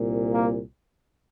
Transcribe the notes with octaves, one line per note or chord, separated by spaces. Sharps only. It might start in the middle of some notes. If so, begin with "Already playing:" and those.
Already playing: C2 A#2
A#3